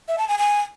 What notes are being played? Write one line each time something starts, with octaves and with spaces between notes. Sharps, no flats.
E5
A5
G#5
G#5